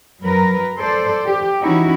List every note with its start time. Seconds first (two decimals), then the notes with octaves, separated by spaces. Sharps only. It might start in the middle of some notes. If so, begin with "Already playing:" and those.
0.21 F#2 F#3 A#4 B4
0.77 A4 C5 D5
1.27 G4
1.61 E3 C#4 D#4 E4 F#4